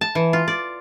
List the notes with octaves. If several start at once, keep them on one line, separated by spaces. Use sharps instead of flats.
A5
E3
F4
D5